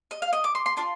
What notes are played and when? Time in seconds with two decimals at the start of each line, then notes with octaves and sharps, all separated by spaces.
0.11 D#5
0.22 F5
0.33 D#5
0.44 D6
0.55 C6
0.66 C6
0.77 D4 F4 C6